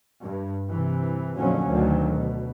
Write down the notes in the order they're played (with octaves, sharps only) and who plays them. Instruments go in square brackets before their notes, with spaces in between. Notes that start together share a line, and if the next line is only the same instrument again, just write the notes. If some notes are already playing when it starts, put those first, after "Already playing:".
[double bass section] G2
C3 E3
F2 A#2 D3 F3 F#3 C#4
D2 B2 D#3 F#3
B2